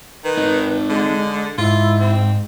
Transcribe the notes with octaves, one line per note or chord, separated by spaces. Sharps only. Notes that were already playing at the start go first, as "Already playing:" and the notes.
D#3 B4
C4 D#4
D3 G#3
G#2 E4 F4
C4